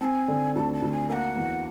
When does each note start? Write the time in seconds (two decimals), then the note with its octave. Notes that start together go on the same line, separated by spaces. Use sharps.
0.01 C4 A5
0.05 G#5
0.28 D3
0.55 D2 A5
0.73 A5
0.82 D2
0.92 G#5
1.09 A#3 F#5 G#5
1.36 E2